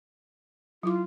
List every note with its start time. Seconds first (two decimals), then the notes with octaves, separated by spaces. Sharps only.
0.83 F#3 E4 F4 D6